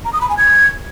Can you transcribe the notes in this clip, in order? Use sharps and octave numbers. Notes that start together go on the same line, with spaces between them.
A#5
D#6
B5
G#5
G#6